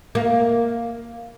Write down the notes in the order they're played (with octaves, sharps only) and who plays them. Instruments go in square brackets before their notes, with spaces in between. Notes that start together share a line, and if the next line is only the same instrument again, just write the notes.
[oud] A#3